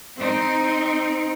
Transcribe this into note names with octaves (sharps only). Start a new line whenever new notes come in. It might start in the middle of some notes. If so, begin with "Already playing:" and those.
C4 D#4